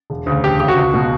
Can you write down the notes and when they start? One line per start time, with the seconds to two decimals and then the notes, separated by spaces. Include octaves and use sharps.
0.10 E1
0.26 D2 C#3
0.44 E1 G4
0.60 D2 C#3 G4
0.68 F#4
0.77 C#2
0.94 B2